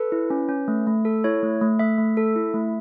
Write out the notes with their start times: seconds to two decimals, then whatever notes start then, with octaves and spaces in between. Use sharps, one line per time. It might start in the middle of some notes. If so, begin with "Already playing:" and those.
Already playing: A4 B4
0.12 E4
0.30 C#4
0.49 C#4
0.68 A3
0.87 A3
1.05 A4
1.24 E4 C#5
1.43 A3
1.61 A3
1.79 A3 E5
1.98 A3
2.17 A4
2.36 E4
2.54 A3